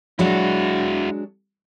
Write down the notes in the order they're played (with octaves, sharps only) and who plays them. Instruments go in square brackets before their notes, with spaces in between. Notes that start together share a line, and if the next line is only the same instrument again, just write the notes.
[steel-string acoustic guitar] F#3 G#3 D4 [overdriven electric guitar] E4 F#4